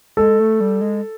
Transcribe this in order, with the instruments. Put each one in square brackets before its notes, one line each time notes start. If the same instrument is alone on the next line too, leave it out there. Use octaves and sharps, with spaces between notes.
[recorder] G#3 [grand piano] A4
[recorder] A3
G3
G#3